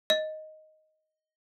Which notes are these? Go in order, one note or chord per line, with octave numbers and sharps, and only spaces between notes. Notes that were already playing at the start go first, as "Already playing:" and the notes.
D#5